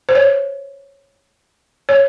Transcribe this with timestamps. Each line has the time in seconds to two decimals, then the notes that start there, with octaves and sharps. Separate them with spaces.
0.09 C5
0.15 C#5
1.89 C#5